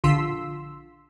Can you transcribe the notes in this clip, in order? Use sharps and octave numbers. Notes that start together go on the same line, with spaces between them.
A#1 D3 F4 C6 E6 B6